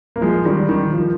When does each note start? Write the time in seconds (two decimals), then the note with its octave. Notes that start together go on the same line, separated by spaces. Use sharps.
0.16 A#3
0.21 F3 G#3
0.45 D#3 G3
0.69 D#3
0.93 F3